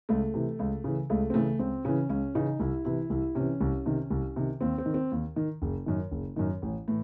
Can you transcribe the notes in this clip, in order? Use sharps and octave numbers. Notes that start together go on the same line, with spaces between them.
C#2 A3
C3 E3
C#2
C#3 E3
C#2 A3
C4
C#3 E3 A3
C#2 C4
C#3 E3 C#4
C#2 C#4
C#3 E3 D#4
C2 E4
C3 E3 E4
C2 E4
C3 E3 C#4
C2
C3 D#3
C2
C3 D#3
D#2 C4
C4
D#3
C4
D#2
D#3
F#1
F#2 D#3
F#1
F#2 D#3
A1
A2 E3